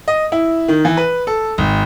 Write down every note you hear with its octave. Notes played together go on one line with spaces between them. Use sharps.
D#5
E4
D#3
E3
B4
A4
G#1